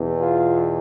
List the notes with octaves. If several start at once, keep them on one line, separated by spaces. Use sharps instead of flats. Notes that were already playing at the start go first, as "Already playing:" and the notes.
Already playing: E2 B2
F4